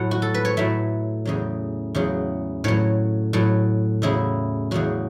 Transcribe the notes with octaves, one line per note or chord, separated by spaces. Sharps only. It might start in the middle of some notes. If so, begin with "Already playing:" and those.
Already playing: A2 F#3 F#5
F#4
A4
B4
C#5
A2 F#3 E5
E2 C#3 F#3
E2 C#3 F#3
A2 F#3 C#5
A2 F#3
E2 C#3 F#3 E4
E2 C#3 F#3 F#4